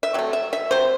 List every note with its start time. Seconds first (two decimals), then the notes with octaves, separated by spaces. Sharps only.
0.03 E5
0.14 C3 F#3 A3
0.33 E5
0.53 E5
0.71 C3 F#3 C5